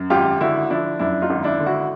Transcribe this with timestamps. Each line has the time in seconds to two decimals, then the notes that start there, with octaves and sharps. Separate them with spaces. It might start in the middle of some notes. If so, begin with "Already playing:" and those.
Already playing: F#2
0.10 G#1 F4 G4
0.41 D3 E4 F#4
0.70 F3 D4 E4
0.99 F#2 D4 E4
1.22 D#4 F4
1.30 G#1
1.44 D4 E4
1.60 D3
1.66 E4 F#4